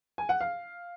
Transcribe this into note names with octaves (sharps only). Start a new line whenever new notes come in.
G#5
F#5
F5